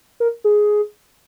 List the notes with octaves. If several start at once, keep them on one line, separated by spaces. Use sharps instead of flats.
A#4
G#4